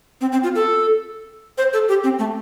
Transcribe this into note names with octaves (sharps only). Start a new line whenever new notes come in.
C4
C4
F4
A4
C5
A4
G4
C4
A3